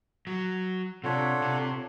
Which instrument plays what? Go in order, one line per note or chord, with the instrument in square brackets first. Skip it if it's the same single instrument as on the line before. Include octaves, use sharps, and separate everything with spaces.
[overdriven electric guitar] F#3
[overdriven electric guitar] C3 [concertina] D4 F4 A4 C#5 F#5
[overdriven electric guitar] C3